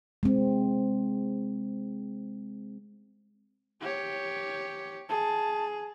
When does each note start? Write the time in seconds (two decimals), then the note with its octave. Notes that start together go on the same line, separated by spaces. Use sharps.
0.23 G#3 C4
3.81 G4 C#5
5.09 G#4 A5